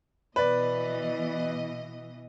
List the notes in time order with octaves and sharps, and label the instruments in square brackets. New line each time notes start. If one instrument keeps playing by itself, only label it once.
[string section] B2 E3 D#5 [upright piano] B4 D5